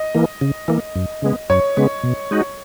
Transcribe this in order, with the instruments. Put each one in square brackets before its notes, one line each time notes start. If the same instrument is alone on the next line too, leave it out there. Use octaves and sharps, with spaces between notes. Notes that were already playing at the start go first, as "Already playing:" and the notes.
Already playing: [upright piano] D#5
[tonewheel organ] E3 A#3
C#3
E3 A#3
F#2
C#3 G#3 B3
[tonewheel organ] F#2 [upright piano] C#5
[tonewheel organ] C#3 G#3 B3
B2
G#3 D#4 F#4